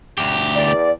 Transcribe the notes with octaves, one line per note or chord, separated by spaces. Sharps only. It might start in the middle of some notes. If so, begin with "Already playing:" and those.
D2 G4
E2 D5